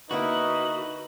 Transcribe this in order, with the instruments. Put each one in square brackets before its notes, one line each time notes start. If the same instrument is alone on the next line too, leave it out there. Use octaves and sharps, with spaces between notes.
[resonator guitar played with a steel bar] D3 A#3 E4 [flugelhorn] D#4 [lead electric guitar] F#4 [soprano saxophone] B4